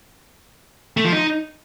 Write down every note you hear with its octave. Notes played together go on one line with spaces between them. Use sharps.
A3
F3
D#4